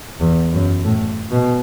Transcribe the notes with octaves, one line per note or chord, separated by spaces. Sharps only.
E2
F#2
A2
B2